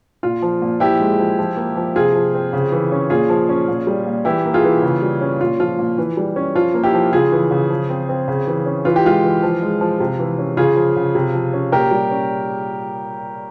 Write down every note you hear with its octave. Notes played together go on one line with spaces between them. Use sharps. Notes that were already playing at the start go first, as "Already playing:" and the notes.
A#2 F4
F3
A#2
F3 E4 G4
G#3
F3
F3
A#3
F3
C3 F4 G#4
F3
C4
C#3
E3
C#4
A#2 F4 G#4
F3
C#4
A#2
G3
A#2
E3 E4 G4
A#3
F4 G#4
E3
C#3
G3
C#4
A#2 F4
F3 F4
A#2
E3
G3
C#4
F3 F4
A#3
E4 G4
F3
C#3 F4 G#4
E3
C#3
F3
C4
C4
C#3
E3
C#4
E3 F4
G4
G#3 F4
E3
F3
G#3
F3
C3
E3
C#4
C#3 F4 G#4
F3
C#3
C3
F3
C#4
A#2 G4 A#4
G3
C#4